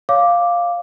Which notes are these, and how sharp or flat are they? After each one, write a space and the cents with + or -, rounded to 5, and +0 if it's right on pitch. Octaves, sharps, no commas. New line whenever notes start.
C#5 +20 F5 +0 D6 +0